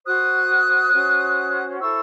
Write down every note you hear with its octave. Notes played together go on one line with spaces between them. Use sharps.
F#4 C5 D#6 F#6
C#4 F#4 C5
E4 A4 C5 C#6 E6